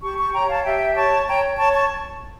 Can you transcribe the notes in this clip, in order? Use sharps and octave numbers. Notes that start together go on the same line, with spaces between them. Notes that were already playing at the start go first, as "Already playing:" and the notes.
G4 A5 C#6
A5 C#6
C#5 G5 A#5
F5 A5
G4 E5 G5
C#5 A5 C#6
C#5 G5 A#5
C#5 A5 C#6
A5 C#6